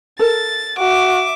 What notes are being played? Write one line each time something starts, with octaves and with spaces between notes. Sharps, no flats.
A4 A#4 A6
F#4 E5 D6